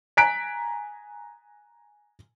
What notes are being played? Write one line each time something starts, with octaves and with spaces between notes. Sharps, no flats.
G#5 A#5 F#6 B6 D7